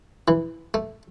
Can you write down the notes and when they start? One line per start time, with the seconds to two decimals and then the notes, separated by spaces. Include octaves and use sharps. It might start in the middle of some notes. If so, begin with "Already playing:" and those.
0.28 E3
0.74 A3